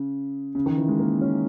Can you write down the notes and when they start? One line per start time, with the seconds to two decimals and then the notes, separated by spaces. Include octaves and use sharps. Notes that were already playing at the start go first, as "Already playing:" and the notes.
Already playing: C#3
0.55 C#3
0.66 D#3
0.77 E3
0.89 G#3
0.99 A#3
1.21 C#4